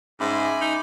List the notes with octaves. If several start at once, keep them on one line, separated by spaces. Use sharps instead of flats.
G#2 C#4 E5 G#5 B5 C6 D6
D#4